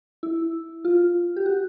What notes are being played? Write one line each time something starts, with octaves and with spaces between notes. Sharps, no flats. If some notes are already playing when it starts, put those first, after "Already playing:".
E4
F4
G4
F#4